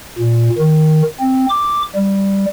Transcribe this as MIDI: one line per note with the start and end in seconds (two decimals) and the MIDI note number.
0.19 0.49 46
0.58 1.02 51
1.20 1.46 60
1.50 1.83 86
1.96 2.46 55